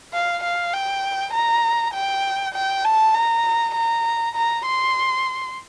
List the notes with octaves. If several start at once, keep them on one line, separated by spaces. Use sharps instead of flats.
F5
F5
G5
A#5
G5
G5
A5
A#5
A#5
A#5
C6